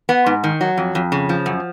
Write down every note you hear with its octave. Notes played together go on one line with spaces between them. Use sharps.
B3
G#2
D#3
F#3
F2
F2
C#3
F3
F#2